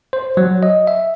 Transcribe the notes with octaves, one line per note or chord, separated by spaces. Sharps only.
C5
F#3
D#5
E5